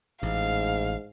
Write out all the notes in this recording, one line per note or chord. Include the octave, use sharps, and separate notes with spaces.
A1 G#2 F5